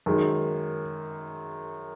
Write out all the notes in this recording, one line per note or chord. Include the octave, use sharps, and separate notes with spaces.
F#2 D#3 G#3